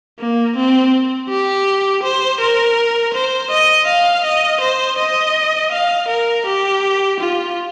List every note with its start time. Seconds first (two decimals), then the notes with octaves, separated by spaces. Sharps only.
0.19 A#3
0.56 C4
1.29 G4
2.03 C5
2.40 A#4
3.14 C5
3.51 D#5
3.87 F5
4.24 D#5
4.61 C5
4.98 D#5
5.72 F5
6.08 A#4
6.46 G4
7.20 F4